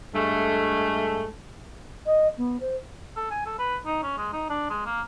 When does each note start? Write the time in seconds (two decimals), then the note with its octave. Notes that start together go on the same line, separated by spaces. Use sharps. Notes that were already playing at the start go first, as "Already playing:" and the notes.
0.14 G2 G#3 A3
2.06 D#5
2.38 B3
2.61 C5
3.17 A4
3.31 G#5
3.46 A4
3.59 B4
3.86 D#4
4.03 C#4
4.18 G#3
4.33 D#4
4.50 D4
4.70 G#3
4.86 A#3